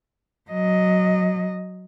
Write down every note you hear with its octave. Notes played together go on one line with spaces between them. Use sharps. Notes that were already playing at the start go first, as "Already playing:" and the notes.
F#3 D#5